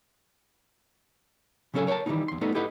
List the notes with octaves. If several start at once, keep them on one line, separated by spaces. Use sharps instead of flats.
C#3 F#3 C#4 D#4 A4 G#5
A#4 C#5 D5 G5 A5
D#3 E3 G3 A3 B3 D#4
E2 C6
G3 A3 B3 D#4 A4
E4 G4 A4 B4 D#5 F#5